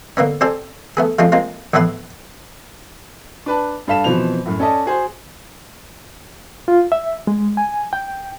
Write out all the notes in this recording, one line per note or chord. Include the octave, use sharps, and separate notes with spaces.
D3 A#3 B3 C#4
C4 G4 A4 C5 D5 G#5
A3 B3 G#4
F3 G#3 A3 C4 C#4 F4
G#3 A#3 C4 F4
A#1 A2 E3 B3 B4 C6
D4 B4 A5
G2 A4 F5 B6 E7
B2 E3 F3 C4 F7
F#2 A2
C#4 A4 D5 D#5 A5
F#4 G#4 C5
F4
E5
G#3
G#5
G5